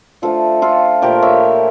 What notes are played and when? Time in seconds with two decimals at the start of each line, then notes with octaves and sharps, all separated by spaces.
0.22 D3 F3 A3 F4 A4
0.62 F4 A4
1.02 A#2 F3 A3 G4 A#4
1.22 C#5 E5